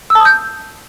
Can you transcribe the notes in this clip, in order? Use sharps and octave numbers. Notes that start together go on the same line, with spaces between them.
E6
A5
D#6
G6